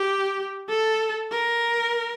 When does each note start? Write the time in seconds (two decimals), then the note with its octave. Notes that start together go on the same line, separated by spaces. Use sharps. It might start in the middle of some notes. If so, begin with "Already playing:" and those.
Already playing: G4
0.69 A4
1.31 A#4